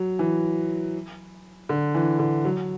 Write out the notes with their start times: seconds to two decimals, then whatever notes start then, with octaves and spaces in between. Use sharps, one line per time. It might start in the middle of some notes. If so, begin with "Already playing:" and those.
Already playing: F#3
0.19 E3
1.69 D3
1.95 E3
2.19 D3
2.45 F#3